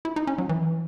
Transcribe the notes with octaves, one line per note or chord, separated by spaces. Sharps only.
E4
D#4
C#4
F#3
E3